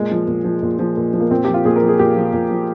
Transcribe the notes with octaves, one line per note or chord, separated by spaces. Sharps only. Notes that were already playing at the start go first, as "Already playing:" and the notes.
Already playing: A#2 G#3
F3
A#2
F3
A#2
F3
A#2
F3
A#3
A#2 C4
F3 G4
F4
A#2 G#4
A#4
F3
G#4
A#2 G4
F3
A#2
F3